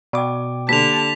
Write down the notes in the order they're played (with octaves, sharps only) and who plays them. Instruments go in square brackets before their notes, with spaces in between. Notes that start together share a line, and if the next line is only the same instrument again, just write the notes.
[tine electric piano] B2 D6 [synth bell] D5 G5
[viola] D3 A5 [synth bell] A#3 G4 [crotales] B6 F7